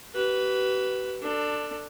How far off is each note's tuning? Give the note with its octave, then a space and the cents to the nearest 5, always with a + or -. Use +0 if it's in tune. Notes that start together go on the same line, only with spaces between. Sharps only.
G4 -45 B4 +0
D4 +10 A4 +30